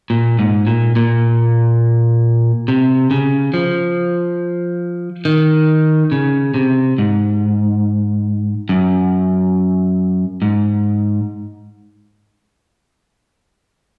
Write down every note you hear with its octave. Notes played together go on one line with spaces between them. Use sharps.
A#2
G#2
A#2
A#2
C3
C#3
F3
D#3
C#3
C3
G#2
F#2
G#2